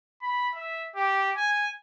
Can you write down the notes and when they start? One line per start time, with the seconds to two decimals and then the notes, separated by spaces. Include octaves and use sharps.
0.22 B5
0.55 E5
0.96 G4
1.37 G#5